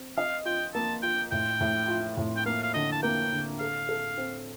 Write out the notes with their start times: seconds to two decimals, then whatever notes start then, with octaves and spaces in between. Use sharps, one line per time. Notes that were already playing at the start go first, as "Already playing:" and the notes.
Already playing: C4
0.17 D#5 F5
0.45 F4 G5
0.75 A#3 A5
1.03 F4 G5
1.32 A2 G5
1.61 A2
1.88 F4
2.17 A2
2.36 G5
2.46 A#3 F5
2.63 F5
2.74 D3 D#5
2.92 A5
3.03 A#3 G5
3.32 D3
3.60 A4 F5
3.89 A4
4.18 C4